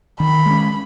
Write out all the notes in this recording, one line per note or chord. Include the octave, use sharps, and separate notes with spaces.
D#3 B5
G#3 C#4